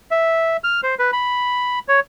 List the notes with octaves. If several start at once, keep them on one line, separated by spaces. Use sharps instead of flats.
E5
F6
C5
B4
B5
C#5